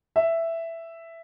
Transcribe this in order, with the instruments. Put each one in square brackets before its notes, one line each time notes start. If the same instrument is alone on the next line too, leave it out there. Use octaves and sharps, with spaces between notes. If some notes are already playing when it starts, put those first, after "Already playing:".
[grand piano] E5